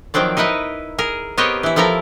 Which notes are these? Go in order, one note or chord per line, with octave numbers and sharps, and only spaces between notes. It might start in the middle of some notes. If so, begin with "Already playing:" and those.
D#3 F3 F#3 C4 D5
D#4 E4 A#4 B4 D#5
G#4 A#4
B3 C4 G4 A#4 C#5 D#5
E3 E4
F3 E4 A4 A#4 A#5